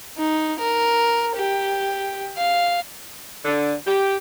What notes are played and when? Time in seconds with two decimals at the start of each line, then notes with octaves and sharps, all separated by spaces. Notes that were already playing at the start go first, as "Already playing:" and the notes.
0.18 D#4
0.59 A#4
1.36 G4
2.37 F5
3.44 D3
3.86 G4